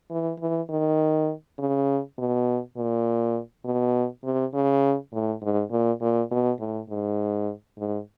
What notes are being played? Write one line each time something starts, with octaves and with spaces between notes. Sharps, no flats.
E3
E3
D#3
C#3
B2
A#2
B2
C3
C#3
A2
G#2
A#2
A#2
B2
A2
G#2
G#2